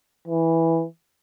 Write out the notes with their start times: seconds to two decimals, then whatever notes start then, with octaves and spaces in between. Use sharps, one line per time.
0.28 E3